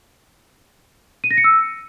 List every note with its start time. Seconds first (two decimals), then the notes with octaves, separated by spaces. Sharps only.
1.24 D#7
1.31 A#6
1.37 C#7
1.44 E6